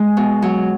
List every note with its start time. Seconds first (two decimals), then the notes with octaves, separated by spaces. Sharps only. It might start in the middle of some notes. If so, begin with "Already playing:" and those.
Already playing: G#3
0.17 B2
0.42 F#3